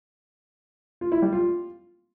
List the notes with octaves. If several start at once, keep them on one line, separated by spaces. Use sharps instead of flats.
F4
E4
G3
F4